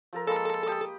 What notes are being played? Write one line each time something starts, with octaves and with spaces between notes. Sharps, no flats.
F3 A4 A#4
G#3 A#3 A4 B5
G4 D#6